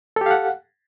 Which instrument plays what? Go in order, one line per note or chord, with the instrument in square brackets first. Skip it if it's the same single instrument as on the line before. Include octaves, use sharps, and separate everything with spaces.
[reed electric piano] A4
G4
F5
F#5